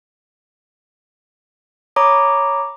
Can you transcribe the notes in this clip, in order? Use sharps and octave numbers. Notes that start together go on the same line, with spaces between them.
C#5 A#5 B5 D6 D#6